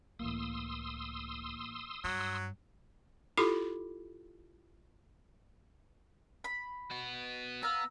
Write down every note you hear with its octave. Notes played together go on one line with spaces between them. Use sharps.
C#2 A2 E3 A3 A#3 C6 D#6 E6
G2 F#3
E4 F4 G4 A4 B5 D6
B5
B3 F#4
B3 F5 A#5 E6